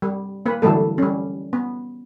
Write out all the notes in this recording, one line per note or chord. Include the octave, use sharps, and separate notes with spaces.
G3
A#3 B4
D3 E3 F#3 G3 A3 A4
G3 C#4
B3